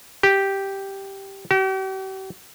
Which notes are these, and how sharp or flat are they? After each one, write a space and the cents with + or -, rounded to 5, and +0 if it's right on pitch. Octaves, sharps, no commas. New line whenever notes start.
G4 -5
G4 -45